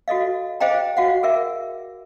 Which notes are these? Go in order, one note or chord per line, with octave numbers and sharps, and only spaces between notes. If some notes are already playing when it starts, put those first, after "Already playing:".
F#4 A4 D#5 F5
G#4 C5 D#5 F5 G5 A#5
F#4 F5 F#5
G#4 A#4 E5